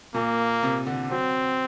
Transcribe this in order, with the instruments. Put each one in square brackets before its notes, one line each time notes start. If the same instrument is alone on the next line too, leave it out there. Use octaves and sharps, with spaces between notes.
[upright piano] A#2 [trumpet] A#3
[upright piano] C3
D3
[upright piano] F#3 [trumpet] C4